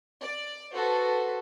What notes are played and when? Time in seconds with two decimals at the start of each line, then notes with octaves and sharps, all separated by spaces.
0.21 D5
0.73 F#4 A4 B4 C5